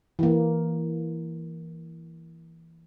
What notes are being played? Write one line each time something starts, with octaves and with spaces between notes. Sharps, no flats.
E3 A#3